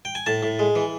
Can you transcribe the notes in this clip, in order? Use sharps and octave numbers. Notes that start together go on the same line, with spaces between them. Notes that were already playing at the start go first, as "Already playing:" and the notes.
G5
G#5
A2 A5
A2
G#3
E3